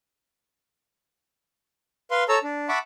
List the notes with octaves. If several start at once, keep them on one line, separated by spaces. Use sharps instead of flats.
B4 F5 C6
A4 C#5 A5 A#5 E6
D4
E5 F#5 A5 B5 C#6 D6